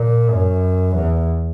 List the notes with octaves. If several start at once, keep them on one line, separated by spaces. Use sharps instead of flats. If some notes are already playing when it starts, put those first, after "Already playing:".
Already playing: A#2
F#2
E2